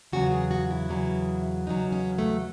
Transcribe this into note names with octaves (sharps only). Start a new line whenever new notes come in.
E2 C#3 F#3 F#4
G#4
F#4
E4
E2 C#3 F#3
E2 C#3 F#3 D#4
C#4
A3